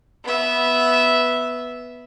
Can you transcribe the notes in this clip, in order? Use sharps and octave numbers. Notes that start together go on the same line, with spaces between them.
B3 E5